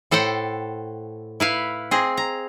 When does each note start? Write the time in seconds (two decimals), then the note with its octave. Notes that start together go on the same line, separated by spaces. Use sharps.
0.11 A2 A4 C5 F#5 G5
1.40 E4 B4 F5
1.91 C4 G#4 D#5
2.17 A#5